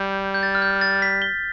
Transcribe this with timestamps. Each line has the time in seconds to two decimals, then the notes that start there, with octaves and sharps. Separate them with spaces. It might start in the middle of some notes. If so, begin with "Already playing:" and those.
Already playing: G3 G6
0.34 G6
0.43 A6
0.55 F6
0.62 G6
0.81 A6
1.02 B6
1.22 G7